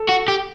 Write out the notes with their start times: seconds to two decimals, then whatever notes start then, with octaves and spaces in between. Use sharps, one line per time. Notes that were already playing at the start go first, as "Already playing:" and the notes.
Already playing: A4
0.09 F#4
0.28 G4